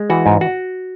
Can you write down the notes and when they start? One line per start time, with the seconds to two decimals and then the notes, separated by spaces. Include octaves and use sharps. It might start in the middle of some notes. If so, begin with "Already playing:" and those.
Already playing: G#3
0.10 E3 F#4
0.26 G#2
0.41 F#4